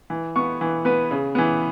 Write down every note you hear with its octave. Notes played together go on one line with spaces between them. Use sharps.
E3
B3 C#6
E3
B3 B4
C#3
E3 B3